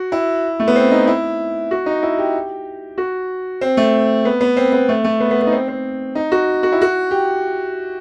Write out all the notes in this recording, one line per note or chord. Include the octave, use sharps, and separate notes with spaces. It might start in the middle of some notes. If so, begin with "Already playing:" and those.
Already playing: F#4
E4
A3
B3
C4
D#4
E4
F#4
D#4
E4
G4
F#4
C4
A3
B3
B3
C4
B3
A3
A3
B3
B3
B3
D#4
C4
C4
D#4
F#4
F#4
E4
F#4
G4